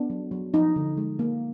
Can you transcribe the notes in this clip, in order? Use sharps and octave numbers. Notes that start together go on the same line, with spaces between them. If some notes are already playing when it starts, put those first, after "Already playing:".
Already playing: B3 D4
F#3
F#3
F3 D#4
D3
G#3
A#3